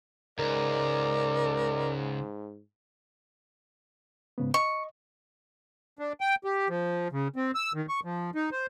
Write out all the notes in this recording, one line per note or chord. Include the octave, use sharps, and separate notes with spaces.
C#2 G#2 A#4 D5
G#2 C#3 B3
D#5 C#6
D4
G5
G4
F3
C#3
C4
E6
D#3
C#6
F3
D#4
C5